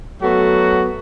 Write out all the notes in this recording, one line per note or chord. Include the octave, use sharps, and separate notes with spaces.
F#3 A3 B3 F#4